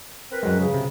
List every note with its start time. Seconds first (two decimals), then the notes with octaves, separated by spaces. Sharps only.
0.30 C4 A#4 B4
0.43 F#2 F#3 G#3
0.59 C#3
0.74 C3